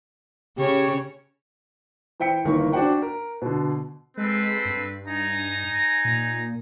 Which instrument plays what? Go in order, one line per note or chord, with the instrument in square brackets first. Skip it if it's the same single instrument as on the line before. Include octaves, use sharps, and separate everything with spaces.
[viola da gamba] C#3 C#5 [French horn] G4
[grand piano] E3 C5 G5 B6 C#7
G1 D#3 E3 A#3 C#6
D4 F#4 C5 F#5 G5
A#4
B2 D3
[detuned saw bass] G#3 [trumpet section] C4 A4 B4
[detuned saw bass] G2
[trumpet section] D#4 G#5 A#5
[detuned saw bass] A#2